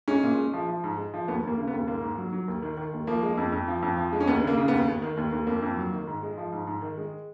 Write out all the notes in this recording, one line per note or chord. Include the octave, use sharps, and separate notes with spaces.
G#3 C#4
A#2
G#3
F3
F3
G#2
G#3
F3
D#2 B3
D#2 A#3
C#3
B3
D#2
G#2 A#3
G#2
F#3
F#3
D#2
D#3
D#3
D#2
F3 A#3
G#3
F2
F2
F3
F2
F3
G#3
C#4
D#2 B3
C#3 A#3
C#3
D#2 B3
D#2
D#3
D#2
D#2
F2 A#3
F2
F#3
D#3
G#2
G#3
F3
G#2
G#2
D#3
G#3